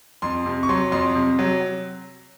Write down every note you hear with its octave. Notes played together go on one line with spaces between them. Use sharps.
F2 C6
C3
C#6
F#3 C6
F2 C6
C3
F#3